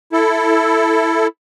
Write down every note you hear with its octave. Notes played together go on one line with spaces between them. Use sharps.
E4 A4